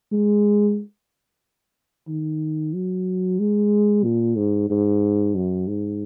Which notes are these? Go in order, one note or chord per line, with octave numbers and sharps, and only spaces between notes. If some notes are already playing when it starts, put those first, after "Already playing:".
G#3
D#3
F#3
G#3
A#2
G#2
G#2
F#2
G#2